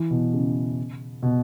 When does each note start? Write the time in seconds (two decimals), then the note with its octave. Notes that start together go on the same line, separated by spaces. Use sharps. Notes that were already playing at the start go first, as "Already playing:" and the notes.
Already playing: E3
0.10 B2
0.33 C#3
1.23 B2